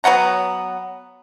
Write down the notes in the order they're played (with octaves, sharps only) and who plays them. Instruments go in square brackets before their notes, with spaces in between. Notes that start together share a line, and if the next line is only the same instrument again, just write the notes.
[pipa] F#3 B3 F#5 A#5